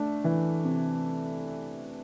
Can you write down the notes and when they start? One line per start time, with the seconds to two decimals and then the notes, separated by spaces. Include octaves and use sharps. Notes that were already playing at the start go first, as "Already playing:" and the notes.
Already playing: A3 D4
0.24 E3
0.64 C3